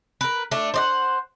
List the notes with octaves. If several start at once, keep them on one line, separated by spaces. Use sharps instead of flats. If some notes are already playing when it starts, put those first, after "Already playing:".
A#4 B4
A3 D4
C5 D5 F#5